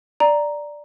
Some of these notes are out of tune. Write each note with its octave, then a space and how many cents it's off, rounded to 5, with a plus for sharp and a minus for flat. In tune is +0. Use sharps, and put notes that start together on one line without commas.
D5 +0 A#5 +0